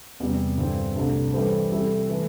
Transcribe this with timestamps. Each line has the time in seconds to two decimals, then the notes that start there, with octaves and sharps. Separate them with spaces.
0.20 E2 C3 G3
0.58 G2 D3 C4
0.96 C2 C3 A3 D4
1.33 E3 G3 E4 A4 C5
1.71 C3 G3 E4 A4
2.09 E3 A3